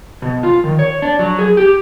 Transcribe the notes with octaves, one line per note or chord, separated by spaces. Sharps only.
B2
F4
D#3
C#5
D4
F#3
G#4
G4